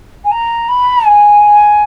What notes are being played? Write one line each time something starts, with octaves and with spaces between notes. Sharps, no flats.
G#5
A#5
B5
G#5